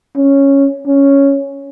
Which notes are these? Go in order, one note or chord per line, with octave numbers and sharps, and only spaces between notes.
C#4
C#4